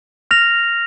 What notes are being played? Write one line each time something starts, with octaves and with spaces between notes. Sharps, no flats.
F6 A#6 F7